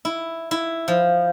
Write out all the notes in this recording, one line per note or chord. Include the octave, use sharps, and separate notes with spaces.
E4
E4
F3